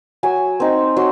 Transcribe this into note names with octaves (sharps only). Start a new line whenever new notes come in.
F#3 G#5
C4 D#4
F#3 C6